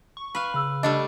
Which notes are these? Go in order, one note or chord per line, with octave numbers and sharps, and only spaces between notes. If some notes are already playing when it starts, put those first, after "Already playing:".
C#6
B4 F5
C#3 B5 E6
G3 A3 D4 D#5